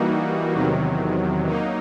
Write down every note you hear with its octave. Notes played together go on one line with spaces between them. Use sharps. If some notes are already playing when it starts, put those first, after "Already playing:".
Already playing: E3 G3 A#3 D#4 F#4
E2 C3 D#3 F#3
F#3 A#3 D#4